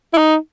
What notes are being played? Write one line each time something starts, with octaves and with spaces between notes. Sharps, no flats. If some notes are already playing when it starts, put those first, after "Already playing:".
E4
D#4